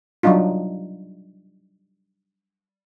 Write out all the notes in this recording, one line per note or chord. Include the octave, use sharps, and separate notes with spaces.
F#3 G3 D4 D#4 F4